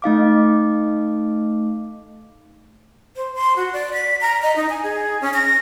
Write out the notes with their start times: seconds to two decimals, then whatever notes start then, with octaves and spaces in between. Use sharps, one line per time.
0.02 A3 D#4 F5 D6
3.16 C5
3.35 C6
3.56 F#4
3.73 D5
3.93 B6
4.21 A#5
4.42 D#5
4.56 D#4
4.70 G#5
4.83 G#4
5.21 C#4
5.34 A#6